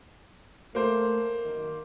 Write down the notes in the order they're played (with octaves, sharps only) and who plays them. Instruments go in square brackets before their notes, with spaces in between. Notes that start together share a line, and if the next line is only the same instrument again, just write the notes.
[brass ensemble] A3 [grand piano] A#3 C5
[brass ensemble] F#2 D#3